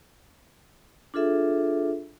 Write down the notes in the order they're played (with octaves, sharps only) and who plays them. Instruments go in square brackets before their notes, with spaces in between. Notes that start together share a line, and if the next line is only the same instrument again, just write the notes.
[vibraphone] D4 F4 G#4 A4 E5